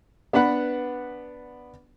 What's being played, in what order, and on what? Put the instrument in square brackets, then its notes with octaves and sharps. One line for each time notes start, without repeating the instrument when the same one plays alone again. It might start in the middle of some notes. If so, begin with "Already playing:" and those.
[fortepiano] B3 D4 B4 F#5